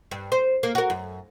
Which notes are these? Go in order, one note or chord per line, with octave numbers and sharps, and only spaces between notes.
G2
C5
A#3
F#4 A#4
F#2